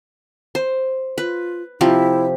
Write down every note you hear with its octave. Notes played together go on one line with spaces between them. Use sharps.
C5
F4 B4
C3 F3 E4 G4